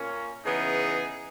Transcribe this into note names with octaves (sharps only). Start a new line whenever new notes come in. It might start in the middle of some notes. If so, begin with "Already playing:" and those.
Already playing: A#2 A#3 C#4
C#3 E3 B3 D#4 G#4